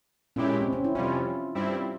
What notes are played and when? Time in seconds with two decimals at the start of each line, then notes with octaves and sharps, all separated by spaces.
0.36 A#2 G#3 C#4 E4 G4
0.61 C4
0.73 C#4
0.84 E4
0.95 F2 C3 G3 C#4 F4
1.55 G2 G3 C4 E4